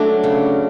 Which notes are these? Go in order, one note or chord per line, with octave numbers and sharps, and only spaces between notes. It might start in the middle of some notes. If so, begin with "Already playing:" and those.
Already playing: F#3 A3 D4
C#3